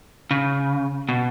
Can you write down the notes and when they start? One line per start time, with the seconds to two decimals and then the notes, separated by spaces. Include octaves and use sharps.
0.31 C#3
1.09 B2